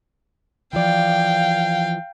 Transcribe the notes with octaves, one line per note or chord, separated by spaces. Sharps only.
E3 F3 D5 F5 G5